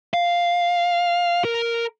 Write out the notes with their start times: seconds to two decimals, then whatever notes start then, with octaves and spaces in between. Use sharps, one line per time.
0.14 F5
1.45 A#4